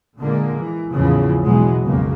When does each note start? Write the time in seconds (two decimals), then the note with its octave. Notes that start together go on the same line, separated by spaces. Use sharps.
0.19 A#2 D3 G#3 A#3
0.59 E3
0.93 A#1 E2 A2 C#3 E3 F3
1.44 B2 E3 F#3 G#3
1.84 B1 F2 C#3 A#3